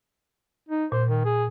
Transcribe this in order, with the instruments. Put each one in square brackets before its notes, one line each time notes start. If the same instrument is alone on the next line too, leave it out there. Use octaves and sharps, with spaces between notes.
[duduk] D#4
[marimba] A#2 [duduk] C5
[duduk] D#3
G#4